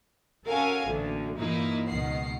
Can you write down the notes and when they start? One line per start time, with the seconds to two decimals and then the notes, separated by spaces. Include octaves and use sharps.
0.47 C#4 F#4 A4 A#4 F5 G#5
0.87 A1 D2 D3 A#3
1.38 G2 A#2 E3 A#3 D#4 E4
1.88 C#2 B2 D#3 F#5 C7